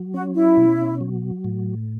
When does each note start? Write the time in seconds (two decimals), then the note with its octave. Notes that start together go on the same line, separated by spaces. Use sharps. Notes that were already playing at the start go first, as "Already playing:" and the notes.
Already playing: F#3
0.14 C#4 F#4
0.35 E4
0.57 B2
1.01 F#3
1.44 A2